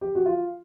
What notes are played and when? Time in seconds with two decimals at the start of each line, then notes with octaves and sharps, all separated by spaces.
0.01 G4
0.15 F#4
0.26 F4